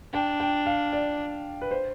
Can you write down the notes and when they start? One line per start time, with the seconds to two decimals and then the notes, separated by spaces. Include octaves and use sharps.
0.13 D4 G5
0.40 G5
0.66 F5
0.93 D5
1.61 B4
1.71 C5